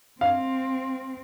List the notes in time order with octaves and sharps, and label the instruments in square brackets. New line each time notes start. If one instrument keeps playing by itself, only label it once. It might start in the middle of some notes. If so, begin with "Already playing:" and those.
[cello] C4 [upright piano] F5